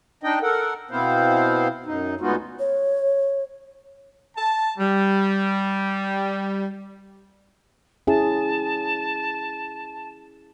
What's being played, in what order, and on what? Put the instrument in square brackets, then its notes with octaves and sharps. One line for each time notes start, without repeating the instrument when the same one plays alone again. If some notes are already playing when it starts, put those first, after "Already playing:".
[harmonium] D4 D#4 D#5 G5
A4 A#4 F#5
B2 B3 C4 E4 C5 F5
F#2 D#4
D2 G#3 B3 D#4 F4 F#4
[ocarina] C#5
[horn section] A5
G3
[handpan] C#4 E4 G#4 [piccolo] A5